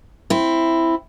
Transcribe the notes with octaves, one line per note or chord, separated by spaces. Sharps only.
C4 E4